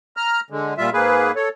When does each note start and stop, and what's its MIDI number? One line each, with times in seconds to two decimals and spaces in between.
0.17 0.40 82
0.17 0.40 89
0.50 0.74 50
0.50 0.74 56
0.78 0.90 46
0.78 0.90 55
0.78 0.90 65
0.78 0.90 76
0.93 1.32 44
0.93 1.32 58
0.93 1.32 68
0.93 1.32 71
1.36 1.49 69
1.36 1.49 73